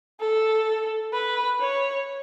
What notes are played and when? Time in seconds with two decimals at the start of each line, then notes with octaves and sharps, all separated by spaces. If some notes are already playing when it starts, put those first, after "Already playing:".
0.20 A4
1.13 B4
1.61 C#5